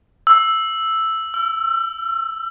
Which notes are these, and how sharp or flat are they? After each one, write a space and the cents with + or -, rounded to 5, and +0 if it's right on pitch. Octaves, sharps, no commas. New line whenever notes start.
E6 +0
E6 +40